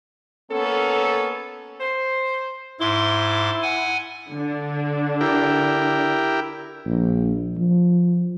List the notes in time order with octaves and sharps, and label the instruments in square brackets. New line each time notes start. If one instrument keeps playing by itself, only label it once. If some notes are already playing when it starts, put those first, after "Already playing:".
[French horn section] A#3 B3 C#4 A4
[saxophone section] C5
[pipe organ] G#2 C6 D6 [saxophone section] E4
[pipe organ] F#5 G#5
[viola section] D3 D4
[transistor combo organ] E4 G4 A#4
[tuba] A#1
F3